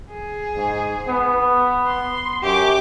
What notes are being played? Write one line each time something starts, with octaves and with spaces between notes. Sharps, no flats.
G#4
G#2
B3
C6
F#2 G4 D6